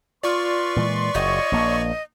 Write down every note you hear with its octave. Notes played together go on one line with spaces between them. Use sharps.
F4 B4 D5 C6 C#6
A#2 E3 G#3
F#1 F4 C#5 D#5
A#1 A#3